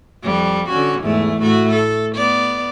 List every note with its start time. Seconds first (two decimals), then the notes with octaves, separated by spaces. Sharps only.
0.23 F2 G3
0.69 D3 C#4 F#4
1.00 E2 G#2 A3
1.40 A2 A3 F#4
1.71 A4
2.15 B3 D5